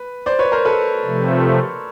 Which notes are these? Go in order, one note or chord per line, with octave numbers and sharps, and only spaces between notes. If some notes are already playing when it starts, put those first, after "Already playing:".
Already playing: B4
C5 D5
B4 C#5
A#4 C5
A4 B4
C3 F3 A3